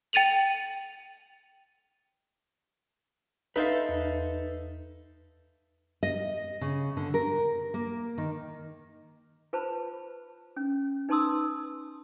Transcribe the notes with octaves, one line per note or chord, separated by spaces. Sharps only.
G5 A6 D#7 F7 F#7
D#4 A4 B4 C5 E5 F5
E2
D#5
C#3
D3
A#4
A#3
D#3
F4 B4 C5 A5 B5
C#4
D#4 B4 A5 C6 D#6 E6